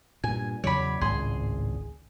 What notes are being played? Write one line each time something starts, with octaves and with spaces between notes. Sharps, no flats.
G2 A#2 G#5
E2 C#3 F#3 C#5 D5 B5
G#1 C#2 A2 G#4 C6